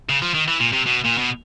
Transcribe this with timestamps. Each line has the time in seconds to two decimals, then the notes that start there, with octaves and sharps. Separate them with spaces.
0.09 C#3
0.22 F3
0.34 D#3
0.48 E3
0.60 A#2
0.73 C3
0.87 B2
1.05 A#2
1.18 B2